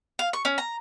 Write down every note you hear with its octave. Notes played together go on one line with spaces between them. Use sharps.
F5
C#6
C#4
A#5